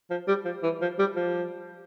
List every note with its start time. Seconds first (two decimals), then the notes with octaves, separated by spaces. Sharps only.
0.10 F3
0.28 G3
0.45 F3
0.63 E3
0.81 F3
0.99 G3
1.16 F3